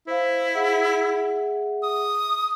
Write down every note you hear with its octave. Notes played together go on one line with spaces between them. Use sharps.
E4 C5 F5
G#4 E5 F#5
D#6